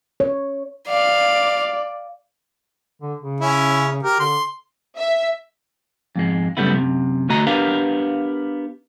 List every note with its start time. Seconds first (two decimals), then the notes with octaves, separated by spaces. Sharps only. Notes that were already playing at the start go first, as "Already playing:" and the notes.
0.20 C#5
0.89 D5 F5
3.02 D3
3.22 C#3
3.41 C#4 E4
4.03 G4 A#4
4.20 D3 C6
4.98 E5
6.16 F2 G#2 G#3
6.57 F#2 C#3 G3 A3 B3 E4
6.74 F#2 C3
7.29 D2 A3 F#4 D#5 A#5
7.47 B3 D4 G4 A#4 B4 F5